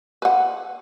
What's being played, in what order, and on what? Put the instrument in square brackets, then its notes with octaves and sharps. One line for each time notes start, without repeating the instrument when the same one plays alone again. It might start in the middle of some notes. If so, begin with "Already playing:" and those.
[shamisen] B4 F#5